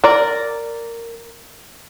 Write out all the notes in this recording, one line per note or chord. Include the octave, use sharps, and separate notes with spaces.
A#4 D5